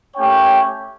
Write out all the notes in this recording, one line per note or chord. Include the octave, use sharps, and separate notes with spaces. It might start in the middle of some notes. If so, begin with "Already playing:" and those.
A3 C#4 G4 C#5 G5